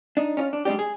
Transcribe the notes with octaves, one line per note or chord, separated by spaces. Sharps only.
D4 D#4
C#4 D4 F4
D4
G3 G#3 C#4 D4 G4
G#4